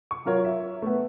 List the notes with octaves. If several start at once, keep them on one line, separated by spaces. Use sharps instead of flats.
C#6
F#3 F4 A#4 C#5
E5
A3 B3